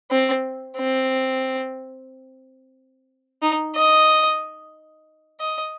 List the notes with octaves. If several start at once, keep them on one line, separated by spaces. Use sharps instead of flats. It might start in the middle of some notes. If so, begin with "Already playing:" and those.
C4
C4
D#4
D#5
D#5